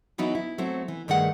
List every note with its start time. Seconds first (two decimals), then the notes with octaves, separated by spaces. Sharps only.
0.18 E3 F#3 B3 D#4 E4 F#4
0.35 E4
0.58 F#3 A3 C4 E4
0.88 E3
1.08 G2 D#3 A3 G#4 F#5